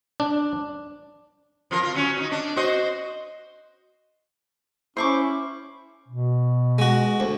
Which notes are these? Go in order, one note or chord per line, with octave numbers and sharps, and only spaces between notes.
D4
F3 F4 A#4
F4
F#3 C#4
F#3 D#4
D4
F#4 C5 D#5
C#4 E4 C5 C#6 D6
B2
G#3 F#4
D2